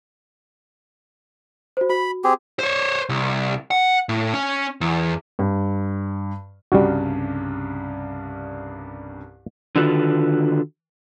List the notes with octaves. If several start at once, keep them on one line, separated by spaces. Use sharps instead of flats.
F#4 C5
F#4 B5
C4 G4 G#4
C5 C#5
C2
F#5
A2
C#4
E2
G2
C2 G2 C#3 G3 F#4
D3 D#3 F4 F#4 A4 B4